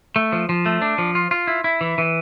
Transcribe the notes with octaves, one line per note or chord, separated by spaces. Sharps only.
A3
F3
F3
A3
D4
F3
F4
F4
E4
E4
E3
E3